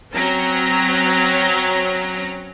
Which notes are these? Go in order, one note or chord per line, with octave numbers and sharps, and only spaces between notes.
F#3 C4 C#4 A#5